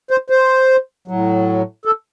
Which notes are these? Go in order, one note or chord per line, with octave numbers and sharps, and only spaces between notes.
C5
C5
A2 F#3
A4